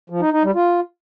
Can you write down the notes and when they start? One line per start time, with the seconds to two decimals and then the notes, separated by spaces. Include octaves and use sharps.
0.10 F3
0.21 D#4
0.32 D#4
0.44 G3
0.55 F4